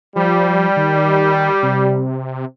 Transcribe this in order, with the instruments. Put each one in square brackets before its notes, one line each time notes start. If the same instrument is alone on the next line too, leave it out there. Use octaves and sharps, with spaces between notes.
[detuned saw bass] F3 [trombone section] G3
[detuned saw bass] D#3
C3